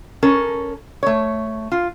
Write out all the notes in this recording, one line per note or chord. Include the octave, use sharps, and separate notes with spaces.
C#4 A4 A#4
A3 C#5
F4